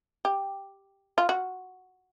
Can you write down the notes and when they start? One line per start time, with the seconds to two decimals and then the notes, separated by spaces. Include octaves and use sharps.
0.25 G4
1.18 F4
1.29 F#4